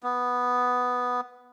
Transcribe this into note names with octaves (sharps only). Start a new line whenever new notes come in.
B3